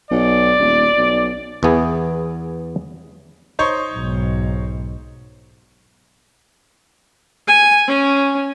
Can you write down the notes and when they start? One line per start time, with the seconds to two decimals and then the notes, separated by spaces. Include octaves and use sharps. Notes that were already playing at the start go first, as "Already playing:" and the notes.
0.11 B1 D5
0.60 D#1
0.98 B1
1.63 E2 E3 B3 G#4
3.59 D#4 C5 C#5
3.92 B1 G#2
7.47 G#5
7.87 C#4